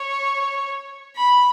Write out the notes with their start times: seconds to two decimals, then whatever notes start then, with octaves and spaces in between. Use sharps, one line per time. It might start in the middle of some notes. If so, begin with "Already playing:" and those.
Already playing: C#5
1.16 B5